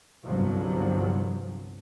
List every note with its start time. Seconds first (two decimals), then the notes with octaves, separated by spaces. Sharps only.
0.24 G1 C2 C3 F3 F#3